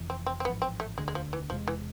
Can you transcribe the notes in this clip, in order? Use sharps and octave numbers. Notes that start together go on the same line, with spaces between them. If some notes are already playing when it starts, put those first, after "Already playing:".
Already playing: F1 F2 E3
C4
C4
C4
A1 G#2 F3 B3
C4
A3
E1 D2 D3 G#3
G#3
F3
E3
E1 E2 C3 F3 G#3
E3